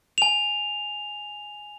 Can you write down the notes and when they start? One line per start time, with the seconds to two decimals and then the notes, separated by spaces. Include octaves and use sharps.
0.18 G#5 F7